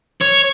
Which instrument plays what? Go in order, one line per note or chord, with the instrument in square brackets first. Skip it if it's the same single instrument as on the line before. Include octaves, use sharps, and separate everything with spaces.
[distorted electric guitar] C#5